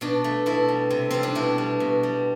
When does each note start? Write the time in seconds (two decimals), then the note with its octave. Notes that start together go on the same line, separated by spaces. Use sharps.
0.01 B2 D4
0.24 A3
0.46 B2 E4
0.69 G3
0.90 C3
1.11 G3 C4
1.23 D4
1.35 B2 E4
1.58 G3
1.80 B2
2.03 G3